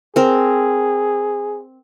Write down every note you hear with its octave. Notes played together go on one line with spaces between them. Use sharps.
C4 G#4 A#4